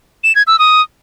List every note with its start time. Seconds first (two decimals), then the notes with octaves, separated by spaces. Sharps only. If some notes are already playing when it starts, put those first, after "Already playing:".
0.23 E7
0.35 G#6
0.47 E6
0.59 D#6